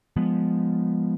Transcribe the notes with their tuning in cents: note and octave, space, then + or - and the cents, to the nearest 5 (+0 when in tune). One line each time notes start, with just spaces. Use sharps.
F3 +0 G#3 -10 B3 +0